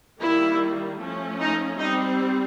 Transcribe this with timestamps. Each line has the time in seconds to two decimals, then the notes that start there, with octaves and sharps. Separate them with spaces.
0.21 D#3 G3 A#3 E4
1.00 F3 A3 C#4
1.40 D#4
1.79 G3 C4 D#4